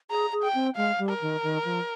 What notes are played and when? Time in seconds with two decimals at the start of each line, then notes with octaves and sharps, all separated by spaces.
0.10 G#4 A#5
0.32 G#4
0.43 G5
0.54 C4
0.76 G#3 F5
0.98 G3
1.09 A#4
1.21 D#3
1.43 D#3
1.65 F3